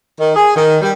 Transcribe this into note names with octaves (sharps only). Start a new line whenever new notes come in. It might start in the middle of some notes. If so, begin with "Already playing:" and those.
D#3
G#4
D#3
G3